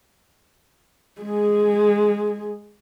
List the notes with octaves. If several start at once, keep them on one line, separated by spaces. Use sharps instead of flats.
G#3 G#4